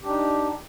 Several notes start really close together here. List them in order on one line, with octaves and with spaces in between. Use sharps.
G4 D4 D#4